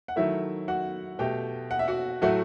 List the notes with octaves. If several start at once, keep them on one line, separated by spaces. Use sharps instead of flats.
F#5
D#3 F#3 A3 E4 E5
F#4 F#5
B2 A3 G4 G5
F#5
E5
F#4 F#5
A2 F#3 A3 F#4 F#5